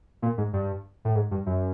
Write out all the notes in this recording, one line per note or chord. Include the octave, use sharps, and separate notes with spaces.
A#2
G#2
G2
A2
G#2
G2
F#2